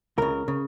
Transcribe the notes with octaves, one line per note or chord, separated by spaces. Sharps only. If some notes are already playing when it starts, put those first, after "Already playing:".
C#2 C#3 A#4
C#3